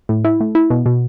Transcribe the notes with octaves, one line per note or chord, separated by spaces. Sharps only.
A2
E4
A3
E4
B2
B2